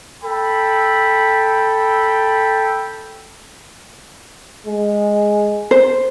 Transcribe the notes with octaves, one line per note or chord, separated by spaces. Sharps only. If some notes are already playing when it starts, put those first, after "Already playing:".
A4 G5 B5
G#3
C5